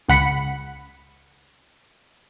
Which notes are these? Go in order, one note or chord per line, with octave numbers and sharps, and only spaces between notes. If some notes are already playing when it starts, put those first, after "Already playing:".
C#2 F#5 B5 C#7